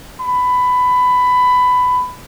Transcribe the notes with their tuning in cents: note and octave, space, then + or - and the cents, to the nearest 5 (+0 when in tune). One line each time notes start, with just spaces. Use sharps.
B5 +15